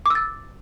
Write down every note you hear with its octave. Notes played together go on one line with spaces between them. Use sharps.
D6 E6 A6